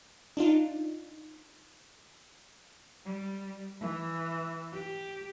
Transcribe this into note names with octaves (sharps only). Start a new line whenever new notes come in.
D4 D#4 F4
G3
E3
G4